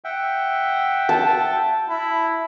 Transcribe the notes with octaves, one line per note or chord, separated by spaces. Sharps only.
E5 F#5 G5
A5
E4